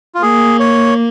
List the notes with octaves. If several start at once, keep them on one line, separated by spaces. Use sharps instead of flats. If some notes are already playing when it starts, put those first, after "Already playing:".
F4
A#3 G#4
C#5